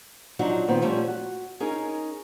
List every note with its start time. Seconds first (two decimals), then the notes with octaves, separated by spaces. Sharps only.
0.39 F3 F#3 D4 D#4 F#4
0.68 A#2 D#3 B3 C4
0.82 F3 G3 A3 C#4
1.07 F#4
1.60 C#4 D#4 G#4 A#4